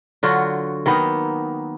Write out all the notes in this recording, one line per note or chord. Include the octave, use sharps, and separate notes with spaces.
D3 F#3 F4 F#4
D#3 A#3 B3 D#4